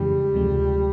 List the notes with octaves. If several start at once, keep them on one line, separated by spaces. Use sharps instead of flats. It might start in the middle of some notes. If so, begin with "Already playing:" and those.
Already playing: F2 C#3 E3 G3 G#3
D2 C3 F3 G#3